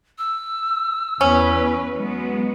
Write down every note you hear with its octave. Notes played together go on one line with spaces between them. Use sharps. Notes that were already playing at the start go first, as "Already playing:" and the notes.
E6
E2 C#4 B4
F#3 G#3 B3